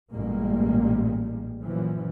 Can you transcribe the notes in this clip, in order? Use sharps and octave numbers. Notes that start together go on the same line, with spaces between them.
A1 G2 A#2 G3 G#3 A#3
F#2 A#2 E3 F3